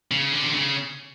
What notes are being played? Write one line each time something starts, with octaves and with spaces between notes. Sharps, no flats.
C#3
D3
C3
C#3